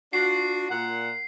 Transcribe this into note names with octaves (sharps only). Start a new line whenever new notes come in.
D4 F4 F#4 C7
A#2 F#5